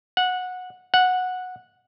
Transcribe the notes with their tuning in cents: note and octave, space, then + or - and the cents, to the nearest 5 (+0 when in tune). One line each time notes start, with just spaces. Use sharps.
F#5 -15
F#5 -10